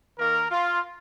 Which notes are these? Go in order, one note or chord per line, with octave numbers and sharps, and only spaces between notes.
D#3 A#3 A#4
F4